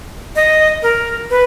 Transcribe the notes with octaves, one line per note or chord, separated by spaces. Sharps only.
D#5
A#4
B4